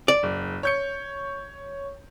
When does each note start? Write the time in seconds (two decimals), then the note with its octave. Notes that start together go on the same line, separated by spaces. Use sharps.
0.08 D5
0.23 F#1
0.63 C#5 G6 C#7